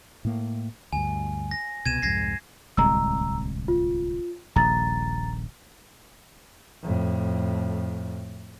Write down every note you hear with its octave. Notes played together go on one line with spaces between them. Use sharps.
A2 A#3
D2 G2 G#5
A#6
C2 B2 G#6 D#7 E7
C2 F2 G#2 G#6 A#6 C7
D1 C2 G#3 A#5 E6
F4
D#1 A#1 A#5 A6
F2 A2